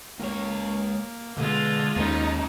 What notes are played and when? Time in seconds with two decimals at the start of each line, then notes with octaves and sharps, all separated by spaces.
0.20 C#2 A#3 C#5
1.38 B2 D3 G#3 F4
1.96 D#2 A#3 C#4 D#4